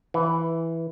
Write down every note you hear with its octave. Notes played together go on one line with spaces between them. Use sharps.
E3